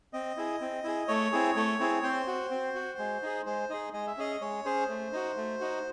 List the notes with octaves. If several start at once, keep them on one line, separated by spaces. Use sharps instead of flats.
C4 D#5
E4 G#4
C4
E4 G#4
A3 C#5
C4 E4 G#4
A3
C4 E4 G#4
C4 C5
F#4
C4
F#4
G#3
D#4 G#4
G#3 C5
D#4 G#4 D#5
G#3 D#5
E5
C#4 G#4 D#5
G#3 C#5
C#4 G#4 C5
A3
D#4 F#4
A3
D#4 F#4